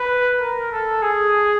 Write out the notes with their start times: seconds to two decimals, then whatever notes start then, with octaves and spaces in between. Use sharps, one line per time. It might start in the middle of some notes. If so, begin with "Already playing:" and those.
Already playing: B4
0.40 A#4
0.72 A4
1.02 G#4